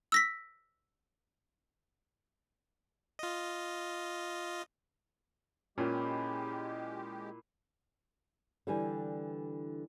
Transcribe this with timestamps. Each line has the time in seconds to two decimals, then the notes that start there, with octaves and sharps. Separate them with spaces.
0.12 E6 A#6 B6
3.19 F4 D#5
5.78 A#2 G#3 C#4 E4 G4 B4 G#5
8.67 D3 E3 G3 G4 G#5